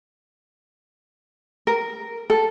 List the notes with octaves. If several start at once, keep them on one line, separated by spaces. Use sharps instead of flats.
A#4
A4